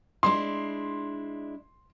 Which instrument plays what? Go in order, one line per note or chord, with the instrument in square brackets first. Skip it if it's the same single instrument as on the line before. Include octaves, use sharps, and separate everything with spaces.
[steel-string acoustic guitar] G#3 D4 E4 [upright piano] C6